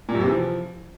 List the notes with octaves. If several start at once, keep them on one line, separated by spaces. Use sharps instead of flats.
A#2
F#2
C3
E3
F3